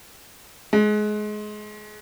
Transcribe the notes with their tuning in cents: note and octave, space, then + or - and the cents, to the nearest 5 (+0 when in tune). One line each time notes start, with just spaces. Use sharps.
G#3 +20